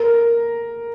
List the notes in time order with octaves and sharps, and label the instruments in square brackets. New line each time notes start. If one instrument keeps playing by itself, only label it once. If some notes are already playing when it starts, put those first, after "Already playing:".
Already playing: [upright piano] A#4